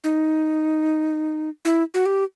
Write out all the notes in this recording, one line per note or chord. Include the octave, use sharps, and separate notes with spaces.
D#4
E4
F#4
G4